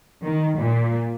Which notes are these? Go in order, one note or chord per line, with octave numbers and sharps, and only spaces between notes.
D#3
A#2